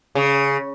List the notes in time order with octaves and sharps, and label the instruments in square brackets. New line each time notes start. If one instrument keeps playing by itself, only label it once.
[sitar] C#3